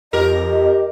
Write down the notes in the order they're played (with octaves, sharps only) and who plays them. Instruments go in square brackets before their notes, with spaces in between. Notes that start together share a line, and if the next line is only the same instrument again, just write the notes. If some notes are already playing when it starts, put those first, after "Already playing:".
[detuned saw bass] F2 [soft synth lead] G4 [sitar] A#4 [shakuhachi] D#5